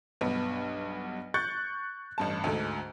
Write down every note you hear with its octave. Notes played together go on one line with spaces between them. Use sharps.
B1 G2 B3
C#6 F#6 G6 A6 C#7
A1 G2 A5
D2 G#2 A4